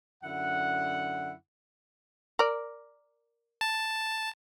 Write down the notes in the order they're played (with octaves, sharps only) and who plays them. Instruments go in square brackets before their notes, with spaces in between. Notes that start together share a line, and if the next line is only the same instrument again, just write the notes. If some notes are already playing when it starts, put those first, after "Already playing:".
[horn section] F#2 D3 E4 F#5
[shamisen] A#4 D5
[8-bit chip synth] A5